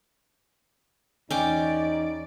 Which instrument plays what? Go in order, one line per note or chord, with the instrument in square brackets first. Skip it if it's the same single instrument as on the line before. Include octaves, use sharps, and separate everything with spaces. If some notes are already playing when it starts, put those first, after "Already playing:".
[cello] E2 D5 [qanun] C#4 G5 D6 [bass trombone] D#4